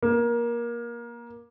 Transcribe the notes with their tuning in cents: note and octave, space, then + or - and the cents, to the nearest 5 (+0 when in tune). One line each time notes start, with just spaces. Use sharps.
A#3 +20